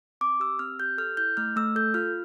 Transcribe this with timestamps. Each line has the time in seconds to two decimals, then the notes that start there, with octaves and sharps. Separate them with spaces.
0.21 C4 D6
0.40 G4 E6
0.59 C4 F6
0.80 G4 G6
0.98 A4 F6
1.17 E4 G6
1.37 A3 F6
1.56 A3 E6
1.75 A4 G6
1.94 F4 F6